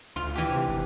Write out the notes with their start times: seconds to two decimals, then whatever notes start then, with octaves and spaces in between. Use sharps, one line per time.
0.16 D2 F4
0.35 E3 G4
0.50 C3
0.69 G#1